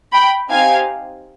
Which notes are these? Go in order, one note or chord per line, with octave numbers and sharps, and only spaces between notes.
G5 B5
C4 D#4 G4 F5 G#5